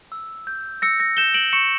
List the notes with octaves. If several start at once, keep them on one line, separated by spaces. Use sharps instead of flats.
E6
G6
E6 A#6 C#7
A#6
G6 E7 G7
D7 F#7
C#6 C#7 E7